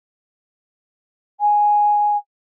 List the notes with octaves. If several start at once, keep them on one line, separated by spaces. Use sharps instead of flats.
G#5